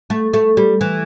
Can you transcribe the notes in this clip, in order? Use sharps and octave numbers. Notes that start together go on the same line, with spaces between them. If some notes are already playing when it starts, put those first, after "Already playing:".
A3
A3
G3
E3